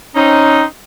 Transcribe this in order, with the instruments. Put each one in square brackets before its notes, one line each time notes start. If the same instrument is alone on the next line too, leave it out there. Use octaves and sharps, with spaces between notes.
[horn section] C4 D#4 [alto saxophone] C#4